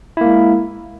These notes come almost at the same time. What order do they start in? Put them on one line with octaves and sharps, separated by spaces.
E4 A#3 G#3